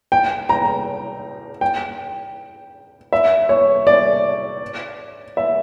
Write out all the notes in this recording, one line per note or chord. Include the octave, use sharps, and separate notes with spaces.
G5
A#5
G5
E5
C#5
D5
E5